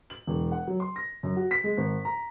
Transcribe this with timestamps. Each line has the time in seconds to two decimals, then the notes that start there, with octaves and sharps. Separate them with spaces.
0.10 F#7
0.27 E1
0.52 F#5
0.67 F#3
0.80 C6
0.96 A#6
1.23 F#2
1.36 F#4
1.51 B6
1.64 G#3
1.77 G#1
2.05 A#5